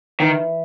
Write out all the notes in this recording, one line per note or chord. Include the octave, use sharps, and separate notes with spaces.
D#3 E3